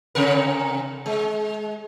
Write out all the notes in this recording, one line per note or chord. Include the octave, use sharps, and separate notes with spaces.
C3 A#4
G#3